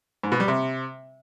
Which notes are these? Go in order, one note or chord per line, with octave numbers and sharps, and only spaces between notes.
G#2
B2
G3
C3